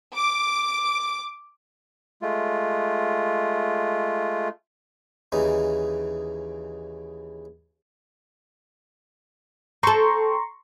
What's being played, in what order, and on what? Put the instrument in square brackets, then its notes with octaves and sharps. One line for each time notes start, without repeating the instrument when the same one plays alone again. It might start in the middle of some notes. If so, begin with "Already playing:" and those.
[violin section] D6
[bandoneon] G#3 A3 F4
[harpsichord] D#2 C#3 E3 D#4
[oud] C4 A4 [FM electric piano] A#5 C6 C#6